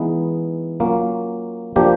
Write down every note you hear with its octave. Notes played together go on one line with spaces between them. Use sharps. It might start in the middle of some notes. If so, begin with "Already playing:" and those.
Already playing: E3 G#3 B3 D#4
F#3 A#3 C#4 F4
F3 A#3 D4 G4